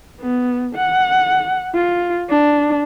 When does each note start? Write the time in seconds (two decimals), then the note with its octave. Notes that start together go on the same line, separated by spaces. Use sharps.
0.21 B3
0.75 F#5
1.75 F4
2.29 D4